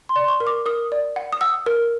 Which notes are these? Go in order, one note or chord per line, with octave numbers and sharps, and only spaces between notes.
C6
D5
C6
C#6
A#4
D6
A#4 D#6
D5
F#5
D#6
F#5 E6
A#4